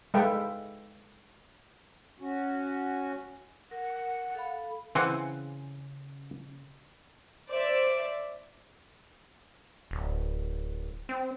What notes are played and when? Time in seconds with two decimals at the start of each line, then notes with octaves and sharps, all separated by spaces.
0.14 G#3 A4 B4 E5 F5 G5
2.20 C#4 F#4
3.71 A#4 F#5
4.35 A4 F5 B5
4.95 C#3 E3 C4 F#5 G#5 C6
7.50 C5 D5 E5
9.91 D1
11.09 C4